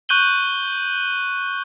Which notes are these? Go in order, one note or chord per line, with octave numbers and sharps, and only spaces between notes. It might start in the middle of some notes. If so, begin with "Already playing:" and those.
C#6 F#6 G6 D#7 F#7 G7